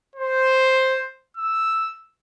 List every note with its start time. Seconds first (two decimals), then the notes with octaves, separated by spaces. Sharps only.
0.16 C5
1.37 E6